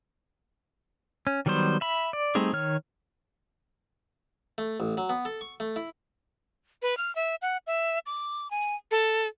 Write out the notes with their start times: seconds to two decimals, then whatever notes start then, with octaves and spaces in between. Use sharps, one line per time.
1.27 C#4
1.46 D#3 F#3 G3 B3 C5
1.81 E5 B5
2.13 D5
2.35 G3 A3 C4 D#4 G#4
2.53 D#3 C#5 F6
4.58 A3
4.80 A1
4.97 F#3
5.09 B3
5.25 A4
5.41 C#6
5.60 A3
5.76 E4
6.82 B4
6.97 F6
7.15 E5
7.42 F#5
7.67 E5
8.06 D6
8.51 G#5
8.91 A4